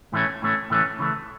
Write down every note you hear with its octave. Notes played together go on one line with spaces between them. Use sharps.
A2 E3 A3 C#4
A2 E3 A3 C#4
A2 E3 A3 C#4
C#3 E3 A3